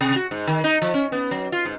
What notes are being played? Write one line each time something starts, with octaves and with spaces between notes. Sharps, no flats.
C3
F#4
G#2
D#3
D#4
F3
C#4
B3
F#3
F4
G#2